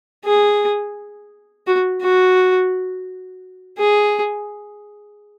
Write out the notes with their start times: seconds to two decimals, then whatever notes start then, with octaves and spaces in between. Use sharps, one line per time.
0.25 G#4
1.67 F#4
2.02 F#4
3.78 G#4